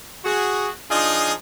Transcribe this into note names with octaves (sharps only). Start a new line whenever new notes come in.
F#4 G#4
F3 D4 D#4 F4 G#4